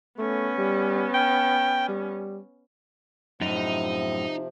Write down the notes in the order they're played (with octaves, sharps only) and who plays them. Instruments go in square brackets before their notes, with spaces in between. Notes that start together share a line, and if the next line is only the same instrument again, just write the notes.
[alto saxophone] A3 [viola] B3 C#4
[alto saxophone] G3
G5
G3
[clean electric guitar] F#2 A2 [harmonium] C3 F3 [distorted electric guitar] D#4